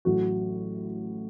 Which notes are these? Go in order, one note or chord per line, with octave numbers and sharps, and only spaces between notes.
A1 A2 F#3 F#4